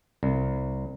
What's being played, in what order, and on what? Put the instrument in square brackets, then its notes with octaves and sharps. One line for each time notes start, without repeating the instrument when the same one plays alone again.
[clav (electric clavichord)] C2